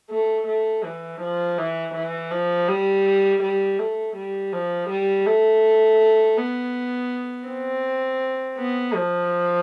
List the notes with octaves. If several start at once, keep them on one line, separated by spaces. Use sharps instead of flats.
A3
A3
E3
F3
E3
E3
F3
G3
G3
A3
G3
F3
G3
A3
B3
C4
B3
F3